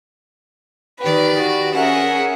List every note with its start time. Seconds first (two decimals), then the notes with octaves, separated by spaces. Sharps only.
1.01 D#3 G4 B4 D5
1.40 F#4
1.74 C#4 G#4 A#4 E5 F#5 G#5